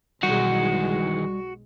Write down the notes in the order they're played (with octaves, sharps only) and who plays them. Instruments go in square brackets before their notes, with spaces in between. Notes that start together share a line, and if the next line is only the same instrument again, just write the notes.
[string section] B1 G#3 [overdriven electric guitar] D#3 E3 [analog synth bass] G3 [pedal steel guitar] F#4